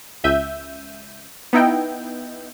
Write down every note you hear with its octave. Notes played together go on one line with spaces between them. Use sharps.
C#2 E5 G6 D#7
B3 D#4 E4 G5